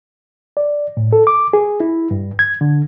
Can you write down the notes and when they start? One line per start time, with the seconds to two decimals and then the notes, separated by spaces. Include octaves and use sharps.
0.57 D5
0.97 A2
1.13 A4
1.27 D6
1.53 G#4
1.80 E4
2.11 G2
2.39 G#6
2.61 D3